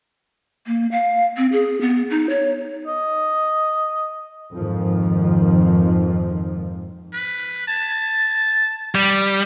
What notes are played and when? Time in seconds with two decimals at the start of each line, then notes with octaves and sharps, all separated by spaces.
0.67 A#3
0.92 F5
1.37 C4
1.52 G#4
1.81 B3
2.11 D#4
2.29 C#5
2.87 D#5
4.53 F2 G#2 D#3 F3
7.14 B4
7.68 A5
8.95 G3